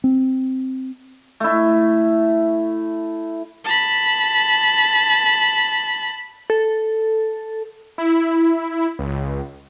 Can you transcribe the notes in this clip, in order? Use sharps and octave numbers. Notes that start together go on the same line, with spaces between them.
C4
A3 E4
A5 B5
A4
E4
C#2